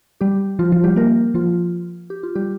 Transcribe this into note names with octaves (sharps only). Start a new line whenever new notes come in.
G3 G4
F3 F4
F3 F4
G3 G4
A#3 A#4
F3 F4
G4
F4
G3 G4